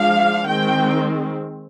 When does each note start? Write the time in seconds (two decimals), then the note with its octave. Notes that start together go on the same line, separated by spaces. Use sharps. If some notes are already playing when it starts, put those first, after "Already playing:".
Already playing: F3 G#3 D4 F5
0.48 D#3 G#3 C4 G5